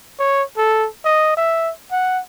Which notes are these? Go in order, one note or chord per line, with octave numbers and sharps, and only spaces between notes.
C#5
A4
D#5
E5
F#5